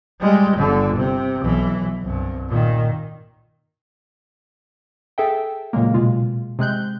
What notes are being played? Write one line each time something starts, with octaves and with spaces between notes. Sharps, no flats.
G3 G#3
G1 D3
C3
B1 E3
C2 G2
A#2 D#3
G#4 A4 E5 G5
A#2 C#3 F#3 G#3 A#3
B2 G#3 F4
C3 G#3 F#6 G6